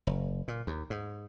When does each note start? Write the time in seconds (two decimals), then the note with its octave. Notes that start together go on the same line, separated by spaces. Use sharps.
0.07 F#1
0.48 A#2
0.67 D#2
0.90 G#2